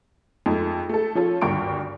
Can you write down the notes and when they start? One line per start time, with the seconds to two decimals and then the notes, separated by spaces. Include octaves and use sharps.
0.46 F2 G#3 A3 D#4
0.89 A3 A4
1.15 F3 C#4 F4 A4
1.41 G#1 D2 G2 G5 C#6 D7